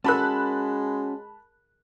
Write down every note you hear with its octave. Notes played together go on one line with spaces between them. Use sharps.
G#3 C#4 F#4 G#4 A#4 A5 B5 F#6